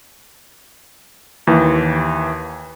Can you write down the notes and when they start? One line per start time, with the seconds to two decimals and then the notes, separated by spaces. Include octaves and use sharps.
1.47 D#2 E3